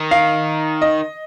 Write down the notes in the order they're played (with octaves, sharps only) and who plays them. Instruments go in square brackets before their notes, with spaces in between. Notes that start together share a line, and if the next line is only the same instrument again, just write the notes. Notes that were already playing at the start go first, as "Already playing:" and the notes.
Already playing: [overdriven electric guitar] D#3
[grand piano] F5
D#5